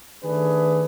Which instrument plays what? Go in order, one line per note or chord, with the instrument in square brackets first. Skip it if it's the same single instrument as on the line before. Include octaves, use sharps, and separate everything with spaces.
[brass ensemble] D#3 A3 D4 G#4 B4